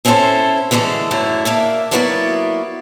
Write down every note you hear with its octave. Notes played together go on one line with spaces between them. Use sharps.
C4 C#4 E4 G#4 A4 C5
D3 E3 G#3 A3 A4
F#2 A2 D3 E4
A#3 D4 E5
F#3 A#3 B3 E4 F#4 D5